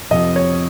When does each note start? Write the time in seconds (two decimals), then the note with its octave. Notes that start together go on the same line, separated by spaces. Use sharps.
0.11 F2 C3 F3 D#5
0.36 C#5